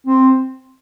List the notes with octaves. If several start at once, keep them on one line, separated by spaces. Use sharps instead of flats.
C4